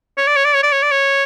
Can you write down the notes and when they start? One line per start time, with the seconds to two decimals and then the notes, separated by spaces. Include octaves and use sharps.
0.18 C#5
0.27 D5
0.36 C#5
0.45 D5
0.54 C#5
0.63 D5
0.72 C#5
0.82 D5
0.91 C#5